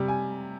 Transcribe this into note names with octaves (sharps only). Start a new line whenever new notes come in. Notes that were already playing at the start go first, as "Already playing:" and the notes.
Already playing: C3 G3
G#5